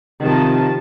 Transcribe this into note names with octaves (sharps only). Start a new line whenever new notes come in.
C3 D#3 F3 A5